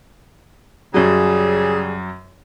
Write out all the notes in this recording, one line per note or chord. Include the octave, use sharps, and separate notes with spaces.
F#2 C#3 F#3 G3 G#4